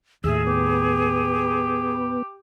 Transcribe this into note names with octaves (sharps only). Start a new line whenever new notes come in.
D#2 A2 G#4 E5
B3 G4